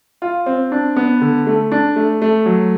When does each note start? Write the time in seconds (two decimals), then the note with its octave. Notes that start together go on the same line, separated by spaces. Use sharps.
0.22 F4
0.46 C4
0.72 D4
0.96 B3
1.21 D3
1.47 A3
1.72 D4
1.96 A3
2.22 A3
2.46 F#3